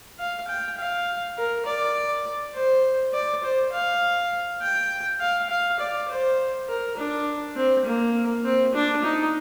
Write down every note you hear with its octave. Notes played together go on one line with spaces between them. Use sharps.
F5
G5
F5
A#4
D5
C5
D5
C5
F5
G5
F5
F5
D5
C5
A#4
D4
C4
A#3
C4
D4
D#4